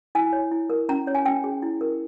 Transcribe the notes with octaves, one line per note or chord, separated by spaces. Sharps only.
E4 G#5
C#5
E4
A#4
C#4 A#5
C#5
G#5
C#4 G5
G#4
E4
A#4